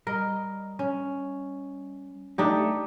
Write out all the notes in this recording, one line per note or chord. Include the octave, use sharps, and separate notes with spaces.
G3 A#4 D#5
C#4
A3 D4 D#4 G4